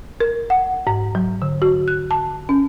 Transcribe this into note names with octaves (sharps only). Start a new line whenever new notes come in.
A#4
F#5
G#2
F#3
D3
F#4
F#6
A5
C#4